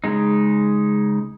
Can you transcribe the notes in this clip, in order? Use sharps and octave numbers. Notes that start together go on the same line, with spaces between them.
C#3 G#3 D#4